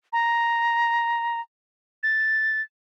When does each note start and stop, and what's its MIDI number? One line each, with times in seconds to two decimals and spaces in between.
0.13 1.40 82
2.03 2.61 93